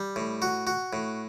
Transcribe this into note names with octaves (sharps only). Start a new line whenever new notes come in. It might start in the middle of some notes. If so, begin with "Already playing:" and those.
Already playing: G3
A2
F#4
F#4
A2